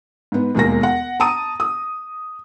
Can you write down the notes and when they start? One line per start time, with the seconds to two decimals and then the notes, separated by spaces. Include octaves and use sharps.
0.32 G#2 B3
0.55 E1 D#2 G#3 A#3 A#6
0.83 F#5
1.20 A5 A#5 D#6 D#7
1.60 D#6